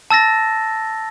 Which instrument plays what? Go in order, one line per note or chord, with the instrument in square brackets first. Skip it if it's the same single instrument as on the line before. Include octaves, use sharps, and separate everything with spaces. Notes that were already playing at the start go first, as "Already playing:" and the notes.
[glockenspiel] A5 E6 A6 A#6